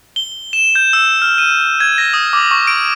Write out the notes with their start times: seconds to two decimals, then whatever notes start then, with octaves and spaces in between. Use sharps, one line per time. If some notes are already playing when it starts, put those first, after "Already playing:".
0.16 G7
0.53 E7
0.75 G6
0.93 E6
1.22 F6
1.38 D#7
1.80 G#6
1.98 A#6
2.14 D#6
2.33 D6
2.51 C#6
2.67 D7